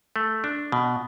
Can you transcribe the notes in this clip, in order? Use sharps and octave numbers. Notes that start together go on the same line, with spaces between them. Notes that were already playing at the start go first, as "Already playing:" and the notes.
A3
D4
B2